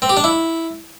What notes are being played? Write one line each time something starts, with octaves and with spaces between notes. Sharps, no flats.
C4
G4
D4
E4